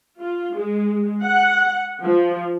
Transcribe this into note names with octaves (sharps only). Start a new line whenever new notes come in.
F4
G#3
F#5
F3